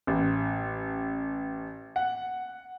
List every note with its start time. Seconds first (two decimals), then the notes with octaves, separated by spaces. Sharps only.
0.07 A1
1.96 F#5